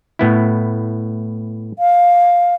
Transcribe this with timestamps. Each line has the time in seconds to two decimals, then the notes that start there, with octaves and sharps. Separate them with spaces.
0.19 A2 B3 E4
1.79 F5